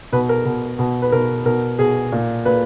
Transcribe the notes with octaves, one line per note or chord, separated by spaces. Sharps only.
B2 B4
A#4
B2
B2
B4
B2 A#4
B2 A#4
B2 G#4
A#2
A#2 B4